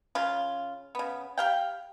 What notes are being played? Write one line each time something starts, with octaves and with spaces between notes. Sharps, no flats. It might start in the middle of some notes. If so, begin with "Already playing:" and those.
C#3 F4
C#3 B3
G4 F5 G5